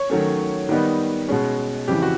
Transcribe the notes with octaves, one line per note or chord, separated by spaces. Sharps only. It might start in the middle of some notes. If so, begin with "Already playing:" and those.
Already playing: C#5
D#3 F#3 A3 C#4
D#3 G3 B3 D#4
B2 G#3 C#4
F2 C#3 E3 G4
F#4